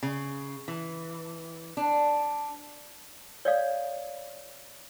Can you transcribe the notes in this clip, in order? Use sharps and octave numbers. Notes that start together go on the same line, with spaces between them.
C#3
E3
D4
C#5 D5 F5